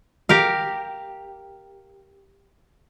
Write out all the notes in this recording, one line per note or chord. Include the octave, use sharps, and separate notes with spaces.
G4 A#4 F5